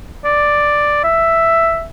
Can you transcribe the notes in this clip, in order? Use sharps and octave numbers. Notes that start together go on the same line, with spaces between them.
D5
E5